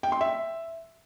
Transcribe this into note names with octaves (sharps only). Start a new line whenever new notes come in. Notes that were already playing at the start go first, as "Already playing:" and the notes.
G5
C6
E5